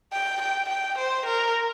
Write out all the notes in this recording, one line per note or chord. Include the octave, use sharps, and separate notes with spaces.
G5
G5
G5
C5
A#4